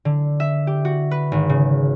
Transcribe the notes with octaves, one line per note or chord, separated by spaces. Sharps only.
D3
E5
G4
F#4
B4
G#1
C#3